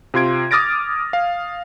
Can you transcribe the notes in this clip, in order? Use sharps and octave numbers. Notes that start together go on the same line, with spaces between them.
C3 F4 C6 G#6 D7
D6 D#6 F6 A6 A#6 D7
F5